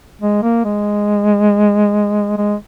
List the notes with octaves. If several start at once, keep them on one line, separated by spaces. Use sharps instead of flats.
G#3
A#3
G#3
G#3